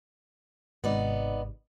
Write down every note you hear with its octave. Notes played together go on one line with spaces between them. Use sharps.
G#1 G#2 C3 B3 D#4 D5